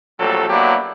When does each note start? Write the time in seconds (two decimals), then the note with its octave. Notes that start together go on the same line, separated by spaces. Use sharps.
0.19 A#1 F#3 G3 A3 A4
0.50 F#3 A#3 B3 D4 E4 G4